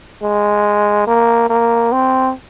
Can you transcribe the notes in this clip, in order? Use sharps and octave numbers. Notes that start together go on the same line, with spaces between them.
G#3
A#3
A#3
C4